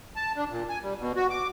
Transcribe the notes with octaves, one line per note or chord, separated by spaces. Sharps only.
A5
D4
A#2
G#5
G3
B2
F#4
D6